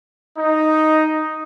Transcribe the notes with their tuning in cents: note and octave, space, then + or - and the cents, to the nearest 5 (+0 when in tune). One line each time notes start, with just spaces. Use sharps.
D#4 +0